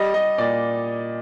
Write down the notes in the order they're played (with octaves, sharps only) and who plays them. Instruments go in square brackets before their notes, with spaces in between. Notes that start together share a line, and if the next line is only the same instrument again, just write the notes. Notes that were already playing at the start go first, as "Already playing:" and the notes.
Already playing: [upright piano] G3 D#5
G3 D#5
A#2 D5